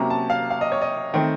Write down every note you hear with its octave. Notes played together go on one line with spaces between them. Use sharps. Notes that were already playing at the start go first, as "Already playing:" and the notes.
Already playing: C3 F#3 A#3 C#4 A#5
A5
F5
F5
D#5
C#5
D#5
D#3 A3 C4